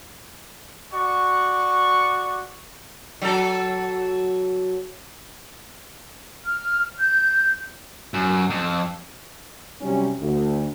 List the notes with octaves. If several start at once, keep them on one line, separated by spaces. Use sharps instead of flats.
F#4 D5 C#6
F#3 A4
F6
G6
F#2
F2
C3 F#3 G3 C#4
D2